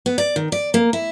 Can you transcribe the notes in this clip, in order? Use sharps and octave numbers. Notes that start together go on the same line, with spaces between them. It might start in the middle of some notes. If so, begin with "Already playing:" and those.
B3
D5
D#3
D5
A#3
E4